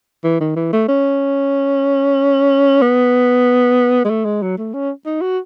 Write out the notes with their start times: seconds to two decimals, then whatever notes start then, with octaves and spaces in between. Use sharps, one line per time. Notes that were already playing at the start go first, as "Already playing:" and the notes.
0.24 E3
0.41 D#3
0.56 E3
0.73 A3
0.89 C#4
2.82 B3
4.05 G#3
4.10 A3
4.25 G#3
4.43 F#3
4.58 A3
4.74 C#4
5.06 D#4
5.22 F#4